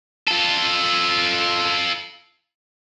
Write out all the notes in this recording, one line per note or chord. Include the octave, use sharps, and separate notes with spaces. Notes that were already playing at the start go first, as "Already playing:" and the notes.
F4 A4